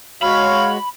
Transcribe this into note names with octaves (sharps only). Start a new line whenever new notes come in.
G#3 F#4 C#5 F5 B5